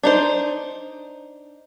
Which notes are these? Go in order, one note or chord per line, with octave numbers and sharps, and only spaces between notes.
D4 D#4 C5